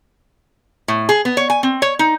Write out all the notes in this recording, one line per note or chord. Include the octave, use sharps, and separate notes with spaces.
A2
G#4
B3
C#5
G#5
C4
C#5
D#4